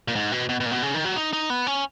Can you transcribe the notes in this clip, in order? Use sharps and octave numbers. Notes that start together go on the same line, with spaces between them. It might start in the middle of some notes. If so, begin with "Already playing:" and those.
A#2
G#2
B2
B2
B2
A#2
B2
C#3
D#3
F#3
D#4
D#4
B3
C#4